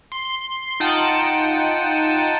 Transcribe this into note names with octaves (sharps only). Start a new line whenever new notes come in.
C6
D#4 F4 F#5 G5 A5 D#7